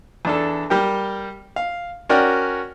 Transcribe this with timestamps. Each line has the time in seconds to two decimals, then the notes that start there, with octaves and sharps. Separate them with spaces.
0.25 E2 D4 A4
0.70 G3 G4 A#4 G5
1.56 F5
2.09 C#4 F#4 A#4 D5 F#5 G5